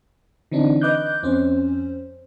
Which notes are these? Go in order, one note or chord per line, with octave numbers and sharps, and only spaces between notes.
D3 E3 C4 D4 D#4
B4 D#5 D6 F#6 G6
F2 C4 C#4 C5